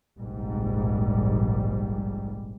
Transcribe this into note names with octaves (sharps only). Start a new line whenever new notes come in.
F1 A#1 G#2 G3